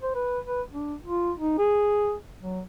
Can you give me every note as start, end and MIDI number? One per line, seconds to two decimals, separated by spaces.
0.02 0.15 72
0.15 0.39 71
0.46 0.62 71
0.72 0.94 62
1.03 1.32 65
1.39 1.57 63
1.58 2.15 68
2.40 2.61 54